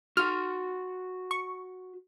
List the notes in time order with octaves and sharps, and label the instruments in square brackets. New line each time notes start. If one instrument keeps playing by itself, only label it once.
[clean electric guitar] F#4 C6 [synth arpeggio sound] F6
[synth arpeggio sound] C#6